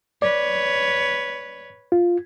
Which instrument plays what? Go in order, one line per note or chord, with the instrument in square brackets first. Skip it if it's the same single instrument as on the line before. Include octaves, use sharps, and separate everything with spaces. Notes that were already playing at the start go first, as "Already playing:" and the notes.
[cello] B4 C#5 [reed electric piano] D5
[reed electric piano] F4